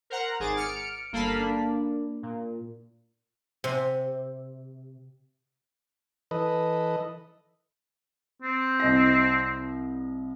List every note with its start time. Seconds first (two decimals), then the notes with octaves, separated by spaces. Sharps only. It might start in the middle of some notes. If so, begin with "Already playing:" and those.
0.10 A#4 C5 F#5 A#5
0.39 G#1 G#4 C5 D6 A6
0.57 F6 C#7 D7
1.12 G1 A#3 A4 F5 A5 B5
1.36 A#3 D4
2.23 A#2
3.64 C3
6.31 E3 A4 B4 D#5
8.42 C4
8.80 C2 D#5 A#6